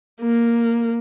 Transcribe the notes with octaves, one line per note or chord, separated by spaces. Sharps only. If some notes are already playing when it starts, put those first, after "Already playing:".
A#3